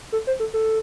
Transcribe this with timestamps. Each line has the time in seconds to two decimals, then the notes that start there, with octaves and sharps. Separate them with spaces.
0.12 A4
0.27 C5
0.40 A4
0.54 A4